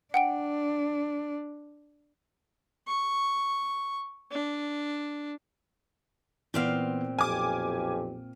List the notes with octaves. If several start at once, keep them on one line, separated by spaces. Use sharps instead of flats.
D4 F#5 G5 D7
C#6
D4
A#2 E3 B3 C4 F5
B1 F2 G4 G#5 D6 F6